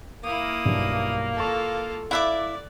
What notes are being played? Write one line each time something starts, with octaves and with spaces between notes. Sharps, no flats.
A#3 E4 D#6
B1 G2
F4 A4 A5 C#6
E4 D5 E5 F5 D6 F#6